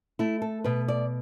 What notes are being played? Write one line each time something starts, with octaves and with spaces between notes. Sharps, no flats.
A3 E4
A4
B2 B4
D5